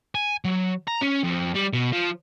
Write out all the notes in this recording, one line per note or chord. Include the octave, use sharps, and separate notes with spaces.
G#5
F#3
A#5
C#4
F2
G3
B2
F3